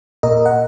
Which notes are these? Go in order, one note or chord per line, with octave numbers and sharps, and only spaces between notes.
A#2 A#4 D#5
F#5